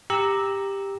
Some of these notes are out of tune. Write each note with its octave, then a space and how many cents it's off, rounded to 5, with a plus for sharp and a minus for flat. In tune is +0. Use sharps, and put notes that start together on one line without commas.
G4 +10 A#5 +0 E6 -15